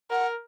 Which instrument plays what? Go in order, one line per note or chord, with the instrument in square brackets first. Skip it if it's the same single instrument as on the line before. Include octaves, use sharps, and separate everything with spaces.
[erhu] A#4 [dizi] F#5